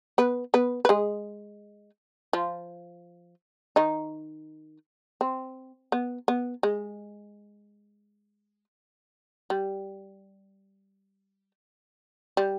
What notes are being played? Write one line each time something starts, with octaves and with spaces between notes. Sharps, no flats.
B3 B4
B3 B4
B4
G#3 G#4
F3 F4
D#3 D#4
C4
B3
B3
G#3
G3
G3